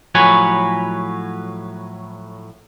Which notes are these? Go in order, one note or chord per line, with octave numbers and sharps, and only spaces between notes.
A2 F3 F#3 B4 C#5 G#5